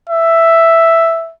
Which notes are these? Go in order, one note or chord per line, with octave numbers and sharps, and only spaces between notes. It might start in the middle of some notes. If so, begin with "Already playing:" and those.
E5